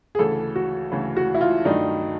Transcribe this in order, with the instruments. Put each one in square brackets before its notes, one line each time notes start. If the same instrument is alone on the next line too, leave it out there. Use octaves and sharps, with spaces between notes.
[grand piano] G#4
[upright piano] D2 C#3 E3 A3 [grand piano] A4
[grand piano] F#4
[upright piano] D2 C#3 E3 A3
[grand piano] F#4
E4
F4
[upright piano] G2 D#3 F#3 A3 D4 [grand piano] D#4